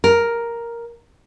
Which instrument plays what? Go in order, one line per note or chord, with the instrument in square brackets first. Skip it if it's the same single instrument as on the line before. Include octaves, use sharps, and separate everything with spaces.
[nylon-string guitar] A#4